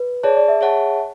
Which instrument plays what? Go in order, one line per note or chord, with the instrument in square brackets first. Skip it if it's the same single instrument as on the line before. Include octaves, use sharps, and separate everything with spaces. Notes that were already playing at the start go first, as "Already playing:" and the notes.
Already playing: [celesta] B4
[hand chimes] G#4 D5 A5 [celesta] C#5
[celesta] D5
E5
[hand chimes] G#4 C#5 F#5 A5